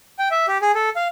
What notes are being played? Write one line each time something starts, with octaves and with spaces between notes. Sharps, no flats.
G5
E5
G4
G#4
A4
F5